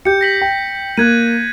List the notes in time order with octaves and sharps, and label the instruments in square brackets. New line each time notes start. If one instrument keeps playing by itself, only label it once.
[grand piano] G4 [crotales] G6 C#7
[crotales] A#6 B6 F#7
[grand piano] G5
[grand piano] A#3 [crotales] F#6 G#6 D#7